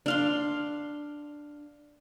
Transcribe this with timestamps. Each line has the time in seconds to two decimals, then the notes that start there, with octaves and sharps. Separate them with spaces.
0.06 D4 F5 C6